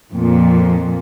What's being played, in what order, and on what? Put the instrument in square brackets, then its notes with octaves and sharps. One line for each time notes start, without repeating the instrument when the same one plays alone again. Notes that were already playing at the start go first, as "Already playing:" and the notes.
[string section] F2 A#2